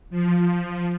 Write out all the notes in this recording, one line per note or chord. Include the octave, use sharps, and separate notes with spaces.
F3